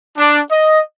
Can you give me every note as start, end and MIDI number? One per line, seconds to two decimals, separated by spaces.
0.17 0.39 62
0.50 0.80 75